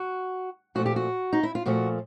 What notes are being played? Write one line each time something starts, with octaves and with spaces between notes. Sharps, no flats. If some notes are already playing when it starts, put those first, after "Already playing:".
Already playing: F#4
A#2 F3 A3 F#4
G4
F#4
D#4
E4
F4
A#2 F3 A3 F#4